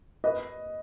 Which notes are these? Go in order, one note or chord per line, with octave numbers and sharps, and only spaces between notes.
B4 D#5